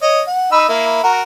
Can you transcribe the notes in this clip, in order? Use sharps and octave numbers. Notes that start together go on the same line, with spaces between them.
C#5 D#5
F#5
D#4 B5 E6
A#3 E4
F#4 A#4